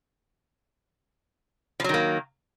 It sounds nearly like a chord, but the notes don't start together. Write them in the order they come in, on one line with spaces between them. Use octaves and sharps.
F3 F#3 D#3 A#3